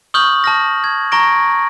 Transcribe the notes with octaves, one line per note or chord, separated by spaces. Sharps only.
C#6 D#6 F6 G6 F#7
A5 F6 A#6
G#6
A#5 C#6 A#6 D7